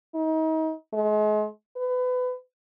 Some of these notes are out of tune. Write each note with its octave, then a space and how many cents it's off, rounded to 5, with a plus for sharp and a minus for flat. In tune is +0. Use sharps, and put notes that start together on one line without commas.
D#4 +35
G#3 +40
B4 +25